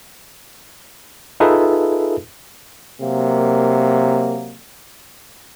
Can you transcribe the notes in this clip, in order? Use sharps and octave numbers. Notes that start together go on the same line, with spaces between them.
D#4 F4 G#4 A4 B4 E5
C3 F#3 A#3